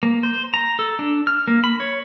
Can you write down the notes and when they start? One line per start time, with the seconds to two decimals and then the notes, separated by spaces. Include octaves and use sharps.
0.03 A#3
0.23 C5
0.54 A#5
0.79 A4
0.99 D4
1.27 F6
1.48 A#3
1.64 B5
1.80 C#5